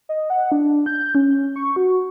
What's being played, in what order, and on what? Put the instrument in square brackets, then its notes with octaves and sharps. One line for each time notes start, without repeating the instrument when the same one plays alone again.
[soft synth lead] D#5
F#5
D4
G6
C#4
C#6
F#4